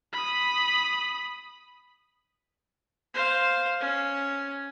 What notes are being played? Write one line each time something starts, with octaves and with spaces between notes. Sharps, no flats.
B5 D#6
C5 F5
C#4